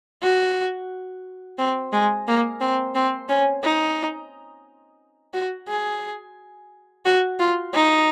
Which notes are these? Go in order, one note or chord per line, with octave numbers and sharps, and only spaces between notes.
F#4
C4
G#3
A#3
C4
C4
C#4
D#4
F#4
G#4
F#4
F4
D#4